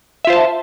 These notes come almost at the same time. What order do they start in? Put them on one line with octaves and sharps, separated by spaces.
E5 F4 C5 A5